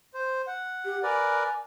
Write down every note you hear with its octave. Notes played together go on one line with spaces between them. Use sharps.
C5
F#5
G4
A#4 B4 D5 G#5